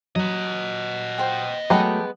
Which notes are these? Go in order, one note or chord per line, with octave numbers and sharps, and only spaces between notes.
F#3 D#5 F#5
C5 G5
F#3 G#3 A3 B3 G4 A4 G5